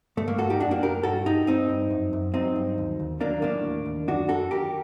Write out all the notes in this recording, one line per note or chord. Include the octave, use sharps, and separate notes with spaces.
G2 A3
A#3
G2 F#4 A4
D#4 G4
F#2 D4 F#4
A#3 D4
F#2 G4 A#4
G2 F#4 A4
G2 D#4 G4
G2 C4 D#4
G2
F#2
F#2
F#3 C4 D#4
G2
D#2
D#2
F#3 A#3 D4
A2 A#3 D4
D#2
D#2
F#2 D4 F#4
F#2 F#4 A4
D#2 G4 A#4